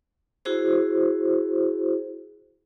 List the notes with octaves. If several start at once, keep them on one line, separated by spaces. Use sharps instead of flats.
E4 F#4 G#4 C5